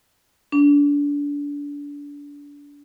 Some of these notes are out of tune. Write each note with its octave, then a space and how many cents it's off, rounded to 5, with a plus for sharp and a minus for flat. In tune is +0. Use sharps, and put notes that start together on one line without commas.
D4 -30